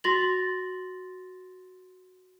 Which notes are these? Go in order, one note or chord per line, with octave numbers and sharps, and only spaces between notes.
F#4 C6 A6 A#6 F#7